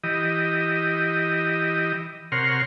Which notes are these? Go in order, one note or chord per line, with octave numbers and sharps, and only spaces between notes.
E3 G4 D#5
C3 A#4 C#5 F#5 C6 F6